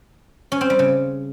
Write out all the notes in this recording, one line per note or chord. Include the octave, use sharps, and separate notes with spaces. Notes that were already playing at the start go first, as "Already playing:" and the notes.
C#4
C4
G3
C#3